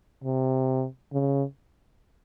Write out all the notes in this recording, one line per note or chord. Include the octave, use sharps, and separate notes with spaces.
C3
C#3